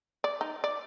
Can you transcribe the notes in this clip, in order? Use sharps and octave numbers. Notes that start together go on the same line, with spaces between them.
D5
D#4
D5